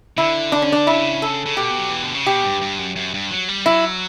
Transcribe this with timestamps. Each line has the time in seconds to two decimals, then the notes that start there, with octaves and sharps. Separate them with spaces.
0.17 D3 E4
0.52 D4
0.62 C#4
0.72 D4
0.87 C#3 E4
1.22 A4
1.46 C#3
1.57 B2 G4
1.78 F#3
1.90 E3
2.03 D3
2.15 C#3
2.26 B2 G4
2.44 G2
2.61 G2
2.79 F#2
2.96 F#2
3.14 G2
3.31 F#3
3.49 G3
3.65 F#3 E4